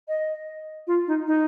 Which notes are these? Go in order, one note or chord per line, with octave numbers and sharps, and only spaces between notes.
D#5
F4
D#4
D#4